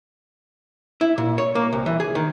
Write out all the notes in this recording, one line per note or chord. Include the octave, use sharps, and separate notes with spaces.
E4
A#2
C#5
A#3
C2
E3
G#4
D#3